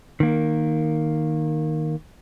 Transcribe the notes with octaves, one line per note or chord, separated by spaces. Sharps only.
D#3 A#3